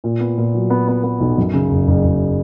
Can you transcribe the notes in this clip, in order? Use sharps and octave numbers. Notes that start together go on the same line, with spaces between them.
A#2
B3
A#2
F#3
B3
B3
B3
B1
F#2
C#3
F#1
F#1
F#1